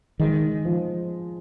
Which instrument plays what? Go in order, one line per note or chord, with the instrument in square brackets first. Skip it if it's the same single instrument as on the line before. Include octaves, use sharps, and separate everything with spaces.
[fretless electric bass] D#3 [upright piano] G#3
[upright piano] F3